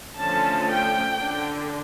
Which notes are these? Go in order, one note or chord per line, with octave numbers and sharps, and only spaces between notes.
D3 F3 A3 C#4 A5
G5
D3